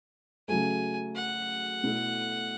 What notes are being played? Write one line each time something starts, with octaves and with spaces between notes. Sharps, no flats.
C#3 F#3 A3 G#5
F#5
B2 A3 E4 A4